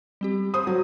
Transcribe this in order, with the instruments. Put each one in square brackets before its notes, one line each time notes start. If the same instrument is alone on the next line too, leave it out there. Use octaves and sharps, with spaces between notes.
[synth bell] G3 C4 G4
[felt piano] C5 D#6
F#3